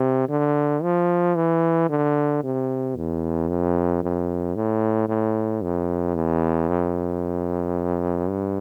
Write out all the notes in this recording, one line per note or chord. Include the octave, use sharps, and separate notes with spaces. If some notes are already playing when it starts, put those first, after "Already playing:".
Already playing: C3
D3
F3
E3
D3
C3
E2
F2
F2
A2
A2
F2
E2
F2
G2